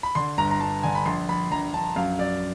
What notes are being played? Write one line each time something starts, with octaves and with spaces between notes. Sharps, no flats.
B5
D3 C6
G1 A#5
A#5
G1 A5
D3 G#5
B5
A#1 C6
A#1 B5
A#1 A#5
A#1 A5
F#2 F5
F#2 D5